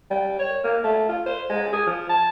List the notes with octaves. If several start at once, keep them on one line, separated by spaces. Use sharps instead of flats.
G3
C#5
A#3
A3
F4
C5
G#3
G#4
F3
A5